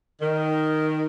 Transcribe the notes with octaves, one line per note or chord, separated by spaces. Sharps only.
D#3